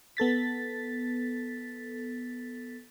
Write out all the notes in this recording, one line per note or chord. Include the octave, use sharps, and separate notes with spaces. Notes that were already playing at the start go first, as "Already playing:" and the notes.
B3 A4 A6 B6